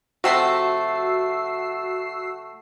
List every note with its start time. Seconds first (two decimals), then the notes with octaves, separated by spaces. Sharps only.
0.24 C3 F3 A3 F#4 E6 C7